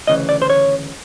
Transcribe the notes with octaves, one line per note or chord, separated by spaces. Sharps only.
D2 C#3 E3 D#5
D5
C5
C#5